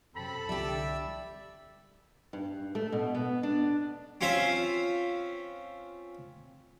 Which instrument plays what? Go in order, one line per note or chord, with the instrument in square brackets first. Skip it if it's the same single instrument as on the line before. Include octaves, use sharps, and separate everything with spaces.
[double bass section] F#2 C3 [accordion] C4 [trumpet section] A4 B5
[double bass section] C2 D3 [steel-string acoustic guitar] G3 G4 [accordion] D5 E5 E6
[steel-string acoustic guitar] G2
A3
B2
B3
D4
[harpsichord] C4 C#4 F4 C5 E5